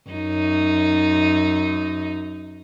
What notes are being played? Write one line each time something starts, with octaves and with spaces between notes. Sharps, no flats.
F#2 D#4